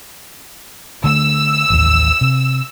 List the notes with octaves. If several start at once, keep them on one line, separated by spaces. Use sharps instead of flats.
D3 A3 E6
A1 D#2
C3